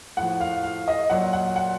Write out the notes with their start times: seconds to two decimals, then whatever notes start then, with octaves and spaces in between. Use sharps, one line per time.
0.17 A2 F3 F#5
0.40 F5
0.63 F5
0.88 D#5
1.10 A#2 F#3 F#5
1.33 F#5
1.56 F#5